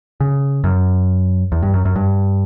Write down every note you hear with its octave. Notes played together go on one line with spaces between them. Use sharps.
C#3
F#2
E2
G2
F#2
F#2
G2